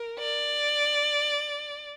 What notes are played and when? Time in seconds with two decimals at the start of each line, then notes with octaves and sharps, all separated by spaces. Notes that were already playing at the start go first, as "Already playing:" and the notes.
Already playing: A#4
0.19 D5